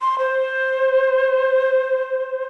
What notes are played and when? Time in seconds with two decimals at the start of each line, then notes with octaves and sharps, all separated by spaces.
0.01 C6
0.19 C5